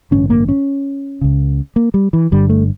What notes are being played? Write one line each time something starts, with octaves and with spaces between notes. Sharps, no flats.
A1 G2 D3 C#4
A#3
C#4
C#2 C#3
A#3
G3
E3
G1 G2 D3 G3
A3